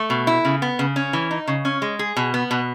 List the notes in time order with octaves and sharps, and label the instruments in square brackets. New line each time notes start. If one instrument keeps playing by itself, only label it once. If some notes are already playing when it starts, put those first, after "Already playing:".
Already playing: [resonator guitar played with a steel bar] A3
B2
E4
C#3
B3
C#3
C#4
E3
D#4
C#3
C#4
G#3
G#4
B2
B3
B2